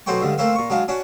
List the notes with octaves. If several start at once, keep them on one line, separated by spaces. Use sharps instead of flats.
B2 F#3 A3 C5 G5 C#6
C#2 G2 D3
A3 A#3 C4 C5 E5 F5
A#2 C#6
F#3 G#3 D4 F5
C#4 D4 F#4